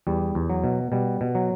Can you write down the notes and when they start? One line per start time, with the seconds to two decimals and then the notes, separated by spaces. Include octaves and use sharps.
0.07 E2 G3
0.35 E2
0.50 F#3
0.64 B2
0.92 B2 G3
1.21 B2
1.35 F#3